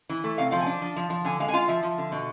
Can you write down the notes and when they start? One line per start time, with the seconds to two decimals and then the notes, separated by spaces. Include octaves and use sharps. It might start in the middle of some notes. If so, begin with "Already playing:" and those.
0.09 E3
0.24 A3
0.38 C3 F5
0.51 F3 F5
0.60 G#5
0.66 D4
0.82 F3
0.96 F3
1.10 F3
1.25 D3 G#5
1.40 G#3 F5
1.49 G#5
1.53 F4 F5
1.68 F3 E5
1.83 F3
1.98 D3
2.12 B2